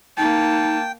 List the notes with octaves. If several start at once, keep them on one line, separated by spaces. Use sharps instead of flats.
A#3 D#4 G5 A5